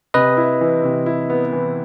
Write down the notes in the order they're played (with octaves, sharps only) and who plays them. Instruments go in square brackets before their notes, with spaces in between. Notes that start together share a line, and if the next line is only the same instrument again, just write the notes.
[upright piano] C3 [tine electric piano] B4 D#5
[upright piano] E4
E3
C3
E4
B3
E3